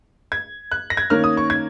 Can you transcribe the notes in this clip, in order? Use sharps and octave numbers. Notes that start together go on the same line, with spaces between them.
G#6
F#6
A#6
G#6
D#3 A#3 C#4 F6
D#6
C#6
G#6